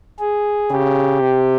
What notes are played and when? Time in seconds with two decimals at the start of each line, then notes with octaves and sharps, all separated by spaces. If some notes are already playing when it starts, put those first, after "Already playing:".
0.19 G#4
0.70 C#3 G4
1.21 C3